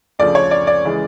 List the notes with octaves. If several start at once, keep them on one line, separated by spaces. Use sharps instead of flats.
D2 C#3 F3 D5
C#5
D5
D5
C#3 E3 G#3